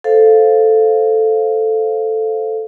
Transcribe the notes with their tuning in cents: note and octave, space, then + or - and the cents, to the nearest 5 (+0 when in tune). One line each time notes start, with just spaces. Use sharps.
A4 +0 C5 +0 F5 +0